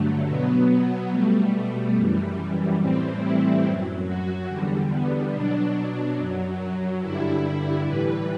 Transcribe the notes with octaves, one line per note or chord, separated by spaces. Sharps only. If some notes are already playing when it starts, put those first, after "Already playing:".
Already playing: G2 D3 F#3 A3
B2 F#3 B3
B2 G3 A3
F#2 E3 G3
A2 E3 G3 C4
E4
F#2 F#3
F#4
E2 D3 G3
B3
B2 F#3 D4
F#2 F#3
G2 D3 G3 E4
A2 E3 G3 B4